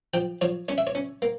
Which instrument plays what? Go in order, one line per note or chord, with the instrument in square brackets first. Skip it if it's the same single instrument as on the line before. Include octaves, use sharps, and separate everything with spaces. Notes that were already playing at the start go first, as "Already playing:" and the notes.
[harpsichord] F3 G5
F3 C#5
C#4 C#5
E5
C#5
C#4
A#3